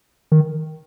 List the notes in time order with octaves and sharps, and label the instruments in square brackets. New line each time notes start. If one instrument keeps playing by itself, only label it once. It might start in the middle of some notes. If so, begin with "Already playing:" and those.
[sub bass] D#3